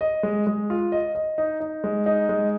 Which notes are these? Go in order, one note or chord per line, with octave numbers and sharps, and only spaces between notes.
D#5
G#3
G#3
F4
D#5
D#5
D#4
D#4
G#3
D#4
G#3